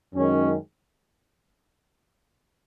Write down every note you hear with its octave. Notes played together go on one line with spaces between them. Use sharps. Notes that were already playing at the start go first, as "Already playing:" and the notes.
F#2 D#3 G#3 C#4